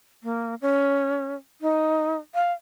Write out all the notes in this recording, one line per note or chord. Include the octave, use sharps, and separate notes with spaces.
A#3
C#4
D#4
F5